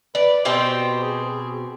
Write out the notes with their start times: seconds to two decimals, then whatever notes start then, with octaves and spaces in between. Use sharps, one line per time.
0.15 B4 D5
0.45 B2 C4 G4 C5
1.02 G#4